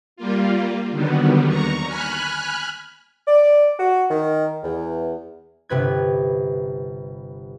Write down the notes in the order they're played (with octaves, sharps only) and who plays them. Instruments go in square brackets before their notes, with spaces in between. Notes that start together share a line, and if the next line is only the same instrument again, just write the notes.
[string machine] G3 A#3 F4
D3 D#3 F#3 G3 B3
D#2 A#5 C#6
G#5 B5 F6 F#6
[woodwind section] D5
F#4
D#3
E2
[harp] G1 C3 B4 G#6